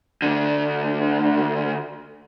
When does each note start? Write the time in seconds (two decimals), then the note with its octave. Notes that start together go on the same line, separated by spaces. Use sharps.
0.22 D2 D3